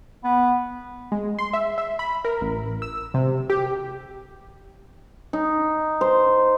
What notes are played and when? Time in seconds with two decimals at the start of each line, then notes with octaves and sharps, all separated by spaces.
0.24 B3
1.12 G#3
1.39 C6
1.53 E5
1.78 E5
1.99 B5
2.25 A#4
2.41 A1
2.82 E6
3.14 C3
3.50 G4
5.33 D#4
6.01 C5